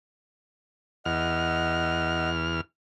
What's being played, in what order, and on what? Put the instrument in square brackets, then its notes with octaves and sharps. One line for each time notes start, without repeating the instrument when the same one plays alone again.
[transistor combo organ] E2 F6 [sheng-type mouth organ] D#5 F#5